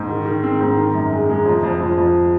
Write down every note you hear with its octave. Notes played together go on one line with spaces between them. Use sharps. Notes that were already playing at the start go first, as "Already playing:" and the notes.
Already playing: G#2
D#3
D#3
C4
G#2
D#3
F#2
G#3
G#3
F2
F2
F2
F2